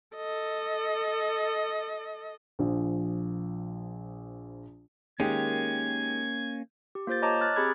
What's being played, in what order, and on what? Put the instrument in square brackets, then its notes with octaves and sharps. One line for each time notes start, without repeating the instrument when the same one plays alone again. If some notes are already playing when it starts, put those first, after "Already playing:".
[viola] A4 D#5
[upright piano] A#1 F3
[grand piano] D#3 G#3 G4 [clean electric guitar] A#3 C#4 [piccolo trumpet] G#6
[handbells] G4
A#3 F4 C5 G6 A6
C#5 D#5 A5 A#5 D6
A#5 F6 F#6 A6
C4 G4 G#4 B5 D6 G#6